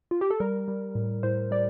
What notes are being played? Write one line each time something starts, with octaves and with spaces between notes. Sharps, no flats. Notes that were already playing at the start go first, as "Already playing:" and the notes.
F4
G4
A4
G3 A#4
G3
A2
A2 C5
G3 D5